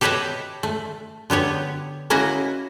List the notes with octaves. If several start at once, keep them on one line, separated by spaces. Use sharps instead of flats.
G4 A4 B4 C#5 D#5 E5
A3
D3 B3 G4 C#5
A#3 C#4 E4 F#4 D#5